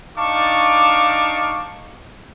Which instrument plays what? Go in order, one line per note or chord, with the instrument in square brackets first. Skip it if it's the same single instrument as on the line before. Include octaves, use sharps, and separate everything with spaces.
[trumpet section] D4 D#4 F5 A5 C#6 D6